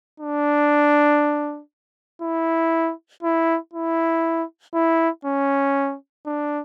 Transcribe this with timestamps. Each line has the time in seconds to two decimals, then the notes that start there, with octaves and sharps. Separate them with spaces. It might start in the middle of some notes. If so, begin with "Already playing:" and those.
0.20 D4
2.22 E4
3.23 E4
3.73 E4
4.74 E4
5.25 C#4
6.26 D4